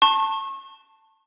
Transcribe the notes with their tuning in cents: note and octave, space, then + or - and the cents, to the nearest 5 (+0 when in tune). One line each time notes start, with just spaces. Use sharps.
A5 +10 C#6 -35